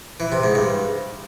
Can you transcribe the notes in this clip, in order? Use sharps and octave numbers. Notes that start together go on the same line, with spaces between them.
E3
C3
G#2
G2